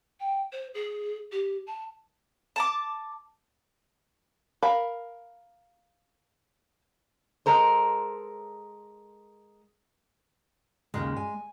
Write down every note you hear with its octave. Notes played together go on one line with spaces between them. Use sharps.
G5
C5
G#4
G4
A5
A5 A#5 D6
A#4 F5 B5
G#3 A4 A#4 C5
D#2 A#2 C#3 G#3
G#5